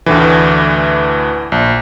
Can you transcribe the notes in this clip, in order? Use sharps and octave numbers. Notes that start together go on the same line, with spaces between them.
D2 A2 D3 E3
A#1